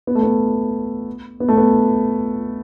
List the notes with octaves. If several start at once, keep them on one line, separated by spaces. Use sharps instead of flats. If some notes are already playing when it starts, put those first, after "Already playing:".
B3
A3
B3
B3
A3
B3